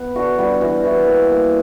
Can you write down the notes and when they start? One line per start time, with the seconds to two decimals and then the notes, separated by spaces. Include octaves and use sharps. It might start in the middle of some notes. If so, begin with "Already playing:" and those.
Already playing: B3
0.15 D3 F#4
0.38 G3 F#4
0.61 E3 F#4
0.84 E3
1.07 A#3
1.30 A#3